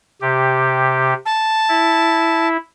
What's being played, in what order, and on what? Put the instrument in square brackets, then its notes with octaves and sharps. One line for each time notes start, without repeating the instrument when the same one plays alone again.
[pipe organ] C3 G4
[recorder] A5
[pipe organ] E4